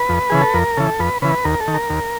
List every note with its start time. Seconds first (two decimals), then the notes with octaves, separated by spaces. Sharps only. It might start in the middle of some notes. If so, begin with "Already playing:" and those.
Already playing: B4
0.09 F2
0.30 C#3 E3 G#4
0.42 A4
0.54 F2 A#4
0.77 C#3 E3 A4
0.99 F2 B4
1.22 C#3 E3 B4
1.44 D#2 A#4
1.60 A4
1.68 D#3
1.74 A#4
1.90 D#2